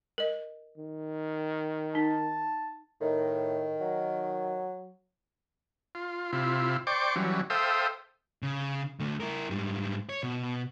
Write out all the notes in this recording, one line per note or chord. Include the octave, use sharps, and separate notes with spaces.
A#4 D#5
D#3
D#4 A5
A2 D#3
F#3
F4
C3 E4 F4
C5 D5 G5 C#6 D6
E3 F#3 G3 C#4
A4 C5 E5 F5 G5 D#6
C#3
D2 A3
E4 A#4
G#2 G3
C#5
B2